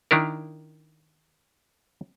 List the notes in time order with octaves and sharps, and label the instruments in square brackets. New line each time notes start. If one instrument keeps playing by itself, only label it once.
[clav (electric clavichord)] D#3 D4 E4 A#4